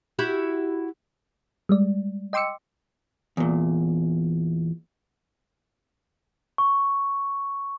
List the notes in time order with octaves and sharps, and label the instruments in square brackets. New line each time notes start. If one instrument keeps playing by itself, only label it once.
[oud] E4 F#4 G4
[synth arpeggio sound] G3 G#3 D5
D#5 G5 C6 D6 E6 C#7
[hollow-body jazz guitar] E2 A#2
[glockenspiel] C#6